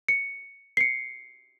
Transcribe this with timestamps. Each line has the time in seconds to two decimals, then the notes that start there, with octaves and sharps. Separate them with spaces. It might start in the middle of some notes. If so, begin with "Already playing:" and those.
0.08 C#7
0.77 C7
0.81 C#7